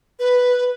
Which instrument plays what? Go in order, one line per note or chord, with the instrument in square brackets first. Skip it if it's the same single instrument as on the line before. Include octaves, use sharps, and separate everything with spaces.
[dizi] B4